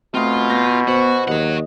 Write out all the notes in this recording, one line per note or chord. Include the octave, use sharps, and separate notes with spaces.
B2 A3 C4 F4
B3 G6 A#6
B3 F#4 C5
D#2 C#5 D#5 F#5